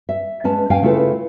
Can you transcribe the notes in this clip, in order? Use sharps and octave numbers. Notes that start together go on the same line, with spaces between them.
E5
G#3 C#4 B4 A5
C#4 F5 G5 G#5
C#3 A3 E4 F4 A4 B4